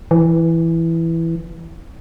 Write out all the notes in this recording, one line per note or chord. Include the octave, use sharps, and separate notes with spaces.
E3